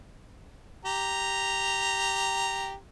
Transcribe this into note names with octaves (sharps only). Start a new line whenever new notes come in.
G4 A#5